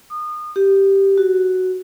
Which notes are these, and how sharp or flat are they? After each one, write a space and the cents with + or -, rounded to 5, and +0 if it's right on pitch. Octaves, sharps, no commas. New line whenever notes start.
D#6 -30
G4 -5
F#4 +5